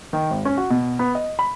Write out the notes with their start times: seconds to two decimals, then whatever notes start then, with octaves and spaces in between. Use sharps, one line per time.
0.13 D#3
0.31 G#1
0.45 C#4
0.57 F#4
0.70 B2
0.99 B3
1.15 D#5
1.39 B5